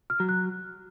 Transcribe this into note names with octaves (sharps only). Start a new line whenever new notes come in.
F6
F#3
F#6